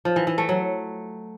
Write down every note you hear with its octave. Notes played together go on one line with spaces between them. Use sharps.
F3
E3
E3
A3
F#3